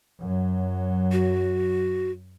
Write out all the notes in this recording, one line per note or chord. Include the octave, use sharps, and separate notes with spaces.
F#2 F#3
F#4